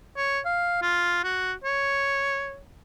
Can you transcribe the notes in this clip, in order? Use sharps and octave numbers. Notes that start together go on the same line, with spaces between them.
C#5
F5
F4
F#4
C#5